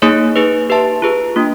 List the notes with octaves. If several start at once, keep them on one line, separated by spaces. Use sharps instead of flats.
A#3 D#4 G#4 C#5
D#4 G#4 B4
G4 B4 E5 A5
F4 G#4 B4
A#3 D4 F4